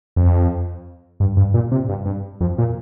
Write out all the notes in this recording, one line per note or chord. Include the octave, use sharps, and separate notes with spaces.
F2
G2
G2
A#2
C3
G2
G2
F2
A#2